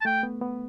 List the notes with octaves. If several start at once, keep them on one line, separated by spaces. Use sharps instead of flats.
A5
A3 G5
B3
B3